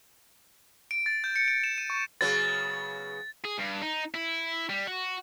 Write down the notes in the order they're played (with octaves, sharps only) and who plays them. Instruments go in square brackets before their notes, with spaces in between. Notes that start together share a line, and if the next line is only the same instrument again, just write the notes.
[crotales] D7
A6
G6
C#7
D7
E7
D#7
C#6
[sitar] C#3 F#3 B3 [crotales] A6
[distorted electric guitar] G#4
G2
D#4
E4
G3
F#4